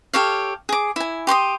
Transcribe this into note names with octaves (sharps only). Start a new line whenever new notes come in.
G4 A4 C#5 F5
G#4 D6
E4 G#5
G4 C6 C#6 D#6